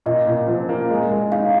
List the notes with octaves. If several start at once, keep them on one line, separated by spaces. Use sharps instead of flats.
A#2 D#5
A#2
F3
A#3
G#3
G#3
D#4 F5